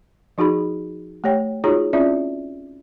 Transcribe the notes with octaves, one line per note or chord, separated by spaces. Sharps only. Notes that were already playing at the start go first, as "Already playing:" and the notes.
F3 D#4 F#4 G#4 B5
A3 G4 C#5 G5
D#4 F4 F#4 G#4 C#5 A#5
C4 C#4 E4 F4 D5 E5